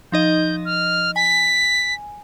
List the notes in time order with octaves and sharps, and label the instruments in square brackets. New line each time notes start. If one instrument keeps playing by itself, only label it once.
[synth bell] F3 D#4 D#5 [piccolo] G6
[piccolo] F6
[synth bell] G#5 [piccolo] B6